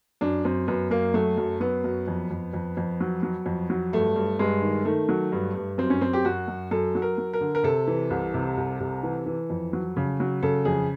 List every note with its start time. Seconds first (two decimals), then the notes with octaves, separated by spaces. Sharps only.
0.21 F#2 D4
0.45 F#2 C4
0.68 F#2 B3
0.91 F#2 A#3
1.14 F#3 A3
1.38 F#2
1.61 F#3 B3
1.84 F#2
2.08 F2
2.31 F2
2.53 F2
2.77 F2
3.00 F#3
3.23 F#3
3.46 F2
3.70 F#3
3.93 G2 A3
4.16 G2
4.39 G2 G#3
4.62 D#3
4.85 D#3 A3
5.09 F#3
5.32 G2
5.55 G2
5.78 F#2 C4
5.90 C#4
6.01 F#2 C4
6.13 G4
6.25 F#2 F#4
6.48 F#2
6.71 F#2 A4
6.95 F#3
7.02 A#4
7.18 F#3
7.33 A#4
7.41 D3
7.55 A#4
7.63 C3 A4
7.87 E3
8.10 C2
8.34 C3
8.57 C2
8.80 C3
9.03 E3
9.26 E3
9.50 F2
9.73 F#3
9.97 C#3
10.20 F#3
10.43 C#3 A4
10.65 F2 G#4